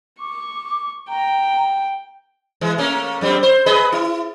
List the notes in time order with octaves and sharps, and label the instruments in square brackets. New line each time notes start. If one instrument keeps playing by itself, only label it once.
[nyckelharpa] C#6 [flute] D6
[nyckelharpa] G5 [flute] A#5
[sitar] E3 G#3
A3 A#3 C#4
F#2 G3 C4
C5
G#4 B4 D#5
E4